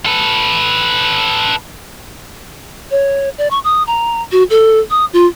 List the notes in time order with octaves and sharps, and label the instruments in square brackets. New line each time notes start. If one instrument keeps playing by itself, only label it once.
[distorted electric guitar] A4 B4
[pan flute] C#5
D5
C#6
D#6
A#5
F#4
A4
D#6
F4